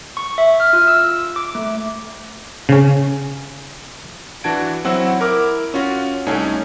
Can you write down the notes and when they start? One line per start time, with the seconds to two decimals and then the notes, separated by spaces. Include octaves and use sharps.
0.17 C#6
0.38 E5
0.60 F6
0.73 F4
0.88 E6
1.36 D6
1.55 A3
2.69 C#3 C#4
4.44 E3 D4 F#4 A5 G#6 D7
4.85 F#3 C4 E4 F#4 F#5 E6
5.20 E4 A#4 D6 E6
5.74 C#4 F4 F#4
6.26 C2 A3 C#4 D#4 G#5